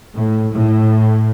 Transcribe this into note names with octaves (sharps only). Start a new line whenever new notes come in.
A2
A2